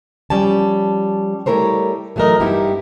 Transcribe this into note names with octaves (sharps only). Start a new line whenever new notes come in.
F3 G3 C#4 A5
G3 A3 E4 A#4 C5 C#5
E3 F#3 A3 D#4 A#4 D#5
G2 B3 D#4 E4 G4